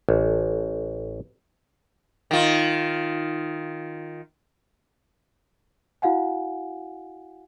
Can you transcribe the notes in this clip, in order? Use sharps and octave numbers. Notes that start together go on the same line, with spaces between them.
A1
D#3 F4
E4 F#4 F5 F#5 G#5